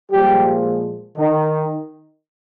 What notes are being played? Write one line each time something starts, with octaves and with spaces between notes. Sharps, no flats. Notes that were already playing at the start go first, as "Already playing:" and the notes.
A#2 F3 G3 G#3 G4
D#3 D#4